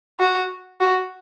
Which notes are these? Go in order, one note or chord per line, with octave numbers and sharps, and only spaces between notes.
F#4
F#4